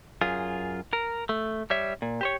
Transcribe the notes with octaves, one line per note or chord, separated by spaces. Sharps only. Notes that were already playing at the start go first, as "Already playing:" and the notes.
F#2 F4 G#4
A#4
A3
G3 C#5 E5
A#2
G4 C5 C#5